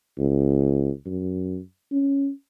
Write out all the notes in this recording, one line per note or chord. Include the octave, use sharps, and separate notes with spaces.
C#2
F#2
C#4